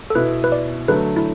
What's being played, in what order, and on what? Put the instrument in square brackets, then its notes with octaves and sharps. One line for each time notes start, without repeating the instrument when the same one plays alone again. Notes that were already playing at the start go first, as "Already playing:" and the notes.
[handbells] A4
[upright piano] B2 B3 E4 [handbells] B4
[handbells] B4
D5
[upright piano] D3 F#3 A3 [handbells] B4
[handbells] E4